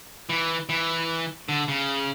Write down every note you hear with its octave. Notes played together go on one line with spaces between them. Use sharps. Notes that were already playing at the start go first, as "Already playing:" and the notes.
E3
E3
D3
C#3